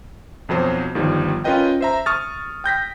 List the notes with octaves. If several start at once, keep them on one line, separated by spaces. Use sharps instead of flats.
B1 F2 F#3 C5
G1 D#3 F3 G3
C#4 F4 A#4 B4 D#5 G5
C5 E5 A#5
C#6 D#6 F6 A6
G5 G6 A#6 B6